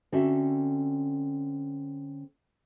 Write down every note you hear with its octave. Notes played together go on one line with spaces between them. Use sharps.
D3 C4 C#4 F#4 A4 E5